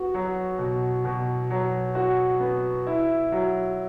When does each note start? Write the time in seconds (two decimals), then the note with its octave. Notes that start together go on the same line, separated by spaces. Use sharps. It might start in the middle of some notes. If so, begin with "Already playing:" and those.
Already playing: B3 F#4
0.14 F#3
0.59 B2
1.05 B2
1.50 F#3
1.95 F#4
2.40 B3
2.87 E4
3.32 F#3